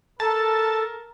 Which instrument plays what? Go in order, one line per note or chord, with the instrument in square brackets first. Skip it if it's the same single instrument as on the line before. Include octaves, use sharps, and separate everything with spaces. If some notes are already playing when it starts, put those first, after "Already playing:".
[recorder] A4 [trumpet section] A#4 [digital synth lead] A5